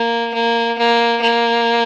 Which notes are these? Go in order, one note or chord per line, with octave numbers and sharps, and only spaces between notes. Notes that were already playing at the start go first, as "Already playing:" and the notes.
Already playing: A#3
A#3
A#3
A#3